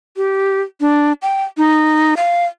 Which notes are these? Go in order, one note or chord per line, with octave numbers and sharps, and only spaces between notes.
G4
D4
G5
D#4
F5